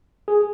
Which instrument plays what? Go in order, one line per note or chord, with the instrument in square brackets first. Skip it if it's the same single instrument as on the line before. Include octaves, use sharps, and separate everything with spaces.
[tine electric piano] G#4